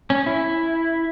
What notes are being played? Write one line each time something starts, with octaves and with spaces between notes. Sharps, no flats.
C#4
E4